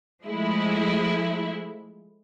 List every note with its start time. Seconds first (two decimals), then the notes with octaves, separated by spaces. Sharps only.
0.25 F3 G#3 A3 E4